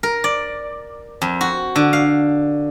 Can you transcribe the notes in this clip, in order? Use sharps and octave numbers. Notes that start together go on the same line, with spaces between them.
A#4
D5
F2
F#4
D3
F5